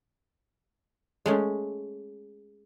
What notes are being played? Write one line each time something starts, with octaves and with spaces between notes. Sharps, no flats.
G#3 A3 C#4